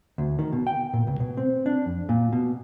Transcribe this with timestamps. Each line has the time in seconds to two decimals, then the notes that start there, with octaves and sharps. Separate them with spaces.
0.18 D2
0.39 D#3
0.53 B2
0.67 G5
0.93 A#2
1.07 C#2
1.20 B2
1.37 C4
1.66 D4
1.86 F2
2.09 A#2
2.33 B2